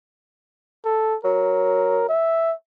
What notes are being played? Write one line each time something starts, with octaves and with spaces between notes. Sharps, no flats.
A4
F#3 A#4
E5